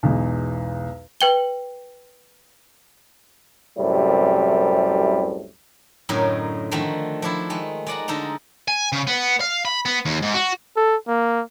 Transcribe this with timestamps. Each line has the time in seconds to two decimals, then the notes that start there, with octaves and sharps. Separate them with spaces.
0.03 B1 E2 G#3
1.21 B4 G5 G7
3.79 C2 F#2 A2 C3 G3
6.09 F#2 A2 D3 D#4 A#4 C#5
6.71 D3 D#3 F3 A3 F#4
7.22 F3 D4 E4
7.50 D#3 G#3 A3
7.87 G#3 D5 F#5 A#5
8.08 D3 G#3 D#4 A4 A#5
8.68 G#5
8.93 C#3
9.07 B3
9.41 F5
9.65 B5
9.86 B3
10.05 D#2
10.22 G#2
10.34 F#4
10.76 A4
11.08 A#3